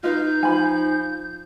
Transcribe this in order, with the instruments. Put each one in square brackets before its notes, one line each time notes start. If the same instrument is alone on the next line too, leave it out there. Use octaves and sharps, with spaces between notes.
[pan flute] D#4 [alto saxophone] F4 [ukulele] B4 D#5 [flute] G6
[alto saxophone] F3 [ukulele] G#5 B5